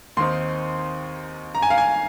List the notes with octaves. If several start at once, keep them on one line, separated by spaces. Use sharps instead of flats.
D#2 D#3 C4 D#4 C6
A#5
G#5
F5
G#5